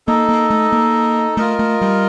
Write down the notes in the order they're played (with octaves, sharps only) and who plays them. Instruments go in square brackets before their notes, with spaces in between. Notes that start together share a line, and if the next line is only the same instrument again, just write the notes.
[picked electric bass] A#3 [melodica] D#4 A4 D#5
[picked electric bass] A#3
A3
A#3
[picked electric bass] A3 [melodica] F4 A#4 D#5
[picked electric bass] A3
G3